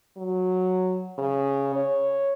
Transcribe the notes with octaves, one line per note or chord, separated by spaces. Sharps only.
F#3
C#3
C#5